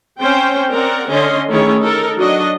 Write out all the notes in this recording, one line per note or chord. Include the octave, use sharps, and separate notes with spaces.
C4 C#4 C5 G5
C4 A#4 D5 F#5
D3 C#4 D#5 C6
D#3 A3 C#4 E4 G#4 C#5
D#4 A4 A#4
F#3 D4 F#4 D#5